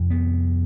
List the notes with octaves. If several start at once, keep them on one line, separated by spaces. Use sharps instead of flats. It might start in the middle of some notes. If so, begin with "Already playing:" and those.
Already playing: F2 C3
B3